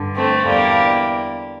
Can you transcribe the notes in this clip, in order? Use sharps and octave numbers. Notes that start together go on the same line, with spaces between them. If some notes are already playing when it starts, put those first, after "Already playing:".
Already playing: G2 D3
A3 C4
E2 D3 G3 A#3